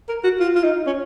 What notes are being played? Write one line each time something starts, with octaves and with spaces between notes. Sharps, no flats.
A#4
F#4
F4
F4
D#4
C#4